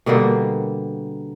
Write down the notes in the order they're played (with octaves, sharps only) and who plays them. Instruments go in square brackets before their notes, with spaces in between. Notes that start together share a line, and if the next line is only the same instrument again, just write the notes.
[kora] B2 D3 G3 A#3